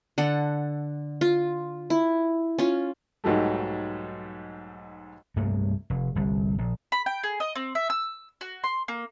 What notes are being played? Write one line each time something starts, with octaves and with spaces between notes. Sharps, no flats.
D3 A4 F#5
F4
E4
C#4 F4
B1 G#2 F#3 G3 A3
C2 G2 A3 A#3
F1
G1 C2
A#1
B5
G5
G#4
D#5
C4
E5
E6
F#4
C6
A#3